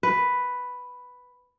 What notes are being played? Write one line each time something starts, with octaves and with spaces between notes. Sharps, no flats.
B4